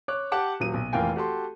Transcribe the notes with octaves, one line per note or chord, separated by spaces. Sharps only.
C#5 D6 F#6
G4 F#5 A5 D6
D#1 F#3 D#7
B1
F1 E3 A#3 F4 G5 G#5
F#4 G4 A4 C6